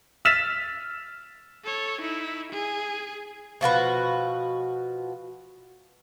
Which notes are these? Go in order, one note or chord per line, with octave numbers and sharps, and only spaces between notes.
E6 F6 A6 B6 E7 F7
A4 C#5
D#4 E4
G#4 G#5
B2 F3 F#4 B4